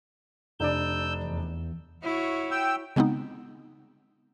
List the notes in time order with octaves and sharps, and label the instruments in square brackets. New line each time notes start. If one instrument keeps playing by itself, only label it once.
[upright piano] F1 D4 D5 [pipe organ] E6 G6
[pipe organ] E2
[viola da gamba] E4 F#4 C#5
[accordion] G5 E6
[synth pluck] C#3 G#3 B3 C4 D#4